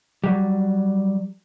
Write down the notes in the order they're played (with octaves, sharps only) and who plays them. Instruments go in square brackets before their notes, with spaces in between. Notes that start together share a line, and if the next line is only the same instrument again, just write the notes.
[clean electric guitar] F#3 G3